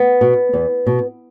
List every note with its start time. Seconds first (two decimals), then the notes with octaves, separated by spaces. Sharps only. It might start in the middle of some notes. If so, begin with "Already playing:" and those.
Already playing: B3
0.21 B2
0.53 E2
0.87 B2